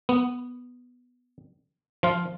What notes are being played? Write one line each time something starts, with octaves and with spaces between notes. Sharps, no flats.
B3
F3 F4